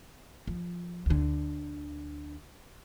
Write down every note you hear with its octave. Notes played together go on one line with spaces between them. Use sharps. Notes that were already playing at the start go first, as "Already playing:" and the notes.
F3
D2 D3